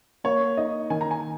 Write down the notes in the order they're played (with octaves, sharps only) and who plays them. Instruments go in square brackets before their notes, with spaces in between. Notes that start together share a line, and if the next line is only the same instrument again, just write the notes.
[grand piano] A#3 [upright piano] C#5
[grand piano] D#4 [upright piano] D#5
[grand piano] D#3 [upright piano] G#5
[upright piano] A#5
G#5